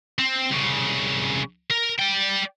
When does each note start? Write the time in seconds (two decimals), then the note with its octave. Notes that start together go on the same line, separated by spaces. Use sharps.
0.19 C4
0.50 C2 C#3
1.71 A#4
1.99 D5 G5